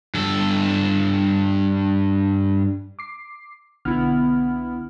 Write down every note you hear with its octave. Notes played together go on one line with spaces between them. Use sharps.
G2 A4
D6 C7
B1 D3 B3 E4 F6